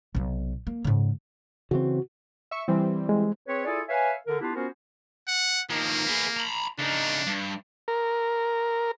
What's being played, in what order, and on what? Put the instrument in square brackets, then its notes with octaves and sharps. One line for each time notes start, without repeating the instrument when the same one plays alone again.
[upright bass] B1 C3
A#3
G#2 C#3
[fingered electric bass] C#3 E3 C4 [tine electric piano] F#4
[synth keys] E5 C#6
E3 G3 C4
[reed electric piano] G#3
[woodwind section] C4 G#4 B4 C#5
E4 F4 G#4 A4 D5 G#5
B4 C#5 E5 F5 G#5
D3 A#4
B3 D4 E4 F4 G4
B3 C#4 F4 F#4 A#4 C5
[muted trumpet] F#5
[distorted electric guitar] D#3 F3 [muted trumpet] A#3
[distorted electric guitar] B3 G#4
A#5 B5
[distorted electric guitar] C#3 D#4 [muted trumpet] D4
[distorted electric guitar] G2
[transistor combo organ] A#4